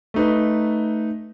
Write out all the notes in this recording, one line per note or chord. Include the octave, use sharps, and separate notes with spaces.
A3 D#4 B4